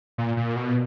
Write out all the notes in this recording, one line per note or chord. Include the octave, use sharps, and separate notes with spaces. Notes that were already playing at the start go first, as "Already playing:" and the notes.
A#2
A#2
B2